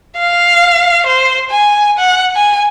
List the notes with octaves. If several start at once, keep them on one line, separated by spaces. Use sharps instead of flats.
F5
C5
G#5
F#5
G#5